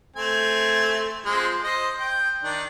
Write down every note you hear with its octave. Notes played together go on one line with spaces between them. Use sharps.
A3 C4 G#5
F3 G#3 C4
C5 D#5
G5
D#3 D4